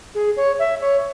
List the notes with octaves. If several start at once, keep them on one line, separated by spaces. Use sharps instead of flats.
G#4
C#5
E5
C#5